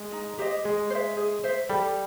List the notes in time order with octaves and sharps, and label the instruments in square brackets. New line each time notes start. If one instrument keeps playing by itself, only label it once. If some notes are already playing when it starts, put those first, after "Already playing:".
Already playing: [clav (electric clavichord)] G#3
[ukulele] D#4
G4 C5 D#5
[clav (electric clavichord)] G#3 [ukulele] G#4
[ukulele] C5
E5
G#4
C5 E5
[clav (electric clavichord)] G3 [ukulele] A4